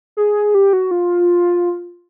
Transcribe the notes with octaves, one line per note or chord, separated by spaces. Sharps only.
G#4
G4
F#4
F4